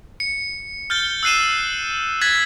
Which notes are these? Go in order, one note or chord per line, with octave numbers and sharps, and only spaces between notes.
C#7
F6 G6 A6 G7
E6 F#6 C7 D#7 E7
E6 F#6 G#6 A6 B6